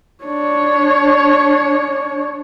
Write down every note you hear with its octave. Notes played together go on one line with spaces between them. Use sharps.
D4 C#5